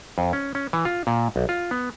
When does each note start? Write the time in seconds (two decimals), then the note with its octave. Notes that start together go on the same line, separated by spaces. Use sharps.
0.18 F2
0.33 C#4
0.55 C#4
0.73 E3
0.85 F4
1.07 A#2
1.36 B1
1.49 F4
1.71 B3